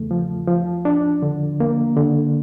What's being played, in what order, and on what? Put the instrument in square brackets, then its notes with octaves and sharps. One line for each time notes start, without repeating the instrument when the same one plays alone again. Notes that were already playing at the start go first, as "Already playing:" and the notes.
Already playing: [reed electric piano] E2 C#3 A3
F3
F3
D4
D3
A#3
D3